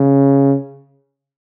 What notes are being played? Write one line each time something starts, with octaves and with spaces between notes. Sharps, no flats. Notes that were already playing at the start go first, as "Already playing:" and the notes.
Already playing: C#3